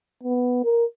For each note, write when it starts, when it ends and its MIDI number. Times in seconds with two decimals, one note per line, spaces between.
0.23 0.63 59
0.64 0.85 70